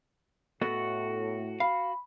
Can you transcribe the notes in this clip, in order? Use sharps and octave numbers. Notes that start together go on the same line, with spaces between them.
A2 B3 F#4 A4 D#5
F5 B5